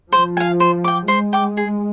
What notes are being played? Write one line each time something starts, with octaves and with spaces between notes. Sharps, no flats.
F3 C5
F5 G#5
C5
G5 D6
G#3 C5
G5 D6
G#4